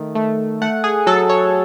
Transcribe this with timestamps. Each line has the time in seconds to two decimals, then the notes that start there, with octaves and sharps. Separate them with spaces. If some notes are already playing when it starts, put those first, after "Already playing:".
Already playing: D#3 A3
0.15 A3
0.62 A3 F#5
0.84 G#4
1.07 F#3 A4
1.29 C#5